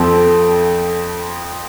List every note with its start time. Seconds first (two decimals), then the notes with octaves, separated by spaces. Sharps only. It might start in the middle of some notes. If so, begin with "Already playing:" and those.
Already playing: F2 F3 C4 A4